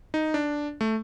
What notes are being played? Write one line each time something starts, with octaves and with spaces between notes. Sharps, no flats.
D#4
D4
A3